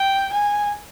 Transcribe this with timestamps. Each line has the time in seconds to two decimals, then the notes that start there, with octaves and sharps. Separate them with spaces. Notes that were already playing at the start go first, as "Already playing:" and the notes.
Already playing: G5
0.33 G#5